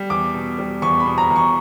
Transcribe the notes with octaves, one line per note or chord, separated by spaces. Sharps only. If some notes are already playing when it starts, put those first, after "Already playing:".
Already playing: G3
E2 D6
B2
G3
E2 C#6
B5
B2
A#5
E2
C#6